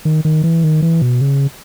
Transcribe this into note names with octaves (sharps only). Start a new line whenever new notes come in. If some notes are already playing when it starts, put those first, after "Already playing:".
D#3
D#3
E3
D#3
E3
B2
C#3